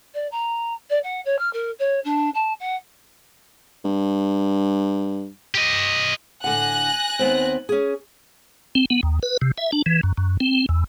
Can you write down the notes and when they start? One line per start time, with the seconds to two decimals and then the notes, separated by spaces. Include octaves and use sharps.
0.14 D5
0.31 A#5
0.90 D5
1.03 F#5
1.25 C#5
1.38 F6
1.53 A#4
1.79 C#5
2.04 D4
2.34 A5
2.59 F#5
3.85 G2
5.55 G4 D#5
6.44 A2 D3 F#5 G#5 F#6 A#6
7.19 D#2 B3 C4
7.69 C#4 G#4
8.75 C4
8.90 B3
9.03 D#2
9.23 B4
9.41 C3
9.58 E5
9.72 D4
9.86 E3
10.03 F#2
10.18 F#2
10.40 C4
10.69 E2